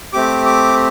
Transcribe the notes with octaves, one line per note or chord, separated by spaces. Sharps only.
A3 C4 G4 D6
D6